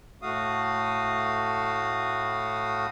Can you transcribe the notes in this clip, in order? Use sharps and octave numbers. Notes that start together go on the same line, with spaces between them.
A2 A3 F#4 F5 D#6